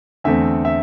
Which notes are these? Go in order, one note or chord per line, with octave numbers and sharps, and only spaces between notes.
E2 D3 A3 C4 E5
E5